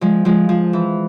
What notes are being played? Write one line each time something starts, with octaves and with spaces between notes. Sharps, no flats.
F3 G#3
F3 G#3
F3
E3